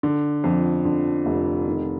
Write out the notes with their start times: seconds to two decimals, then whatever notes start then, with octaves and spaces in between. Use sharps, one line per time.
0.03 D3
0.44 F2
0.85 D3
1.26 F1
1.67 D#3